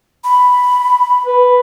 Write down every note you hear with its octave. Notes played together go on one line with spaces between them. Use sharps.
B5
B4